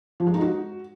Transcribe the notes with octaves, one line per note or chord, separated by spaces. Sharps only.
F3
G#3
D#4
F#4